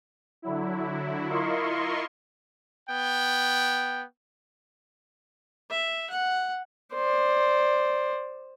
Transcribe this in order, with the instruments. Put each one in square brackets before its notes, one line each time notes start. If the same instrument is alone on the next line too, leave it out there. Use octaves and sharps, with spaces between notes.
[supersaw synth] D3 F#3 E4
E4 F4 A#4 D#5 C6 C#6
[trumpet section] B3 G5
[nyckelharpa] E5
F#5
C5 D5